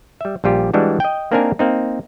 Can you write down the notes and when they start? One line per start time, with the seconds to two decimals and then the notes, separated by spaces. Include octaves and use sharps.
0.21 G3 E5
0.44 A#1 G3 F4 G4
0.74 E3 G3 G#3 D4 F#4
1.00 D#5 G5
1.32 A#3 C4 D4 D#4 A#4 G#5
1.59 A#3 C4 D#4